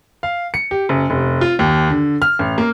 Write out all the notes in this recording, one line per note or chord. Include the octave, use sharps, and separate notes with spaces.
F5
C#7
G4
F#1
F1
F4
D#2
D3
F6
A1
A#3